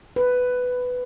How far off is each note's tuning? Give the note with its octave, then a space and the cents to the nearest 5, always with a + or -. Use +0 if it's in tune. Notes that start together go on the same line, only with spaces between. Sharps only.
B4 +10